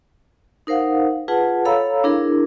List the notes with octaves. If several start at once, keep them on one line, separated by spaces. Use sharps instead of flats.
D#4 A#4 C5 F5 F#5
F4 G#4 B4 F#5 A5
A4 C#5 F5 A#5 B5 E6
D4 E4 G#4 A#4